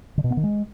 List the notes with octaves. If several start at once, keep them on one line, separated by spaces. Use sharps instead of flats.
D3
B2
B3
D#3
G#3